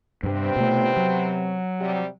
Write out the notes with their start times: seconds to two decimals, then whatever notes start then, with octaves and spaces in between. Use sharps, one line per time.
0.23 G2 C3 G3 B3 C4
0.56 B2 A3
0.97 F#3
1.79 C3 G3